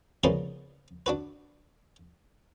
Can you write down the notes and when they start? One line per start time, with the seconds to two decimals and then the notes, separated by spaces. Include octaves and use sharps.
0.24 C#3 F3 G3 G#3 A#3 B3
1.06 D4 F#4 B4